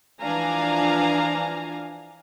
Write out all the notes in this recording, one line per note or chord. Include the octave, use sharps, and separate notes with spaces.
E3 F3 D4 F5 G#5 A#5